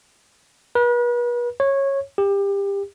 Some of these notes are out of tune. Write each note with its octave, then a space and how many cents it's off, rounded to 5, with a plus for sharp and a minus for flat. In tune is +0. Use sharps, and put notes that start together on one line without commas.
B4 -40
C#5 -15
G4 +25